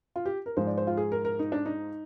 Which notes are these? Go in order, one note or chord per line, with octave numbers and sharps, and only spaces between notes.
F4
G4
A#4
G#2 F3 G#3 C5
D5
C5
F4
G#4
A#4
A#4
D#4
D4
D#4